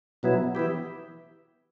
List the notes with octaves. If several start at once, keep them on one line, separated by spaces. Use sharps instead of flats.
B2 F#3 B3 E4
E3 B3 E4 G4